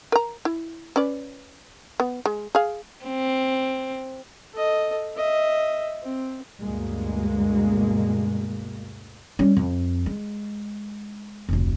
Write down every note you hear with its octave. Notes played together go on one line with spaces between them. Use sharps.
A#4 A#5
E4
C#4 B4 D5
B3
G#3
G#4 F5
C4
A4 D#5
D#5 E5
C4
D2 G2 B2 G#3 A#3
G3 C#4
F2
G#3
F1 D2